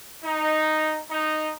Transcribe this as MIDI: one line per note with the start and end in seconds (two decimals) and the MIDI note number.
0.23 0.99 63
1.10 1.51 63